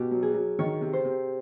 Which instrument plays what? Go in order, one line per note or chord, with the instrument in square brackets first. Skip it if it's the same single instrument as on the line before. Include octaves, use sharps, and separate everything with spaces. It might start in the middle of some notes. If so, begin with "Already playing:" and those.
Already playing: [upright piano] B2 [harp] G4
[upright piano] F#3
[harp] G#4
[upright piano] F#3
[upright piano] D#3 [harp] C#5
[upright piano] C3
[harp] C5
[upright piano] C3